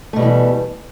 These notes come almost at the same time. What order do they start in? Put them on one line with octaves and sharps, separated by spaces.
A3 B2 G3 E3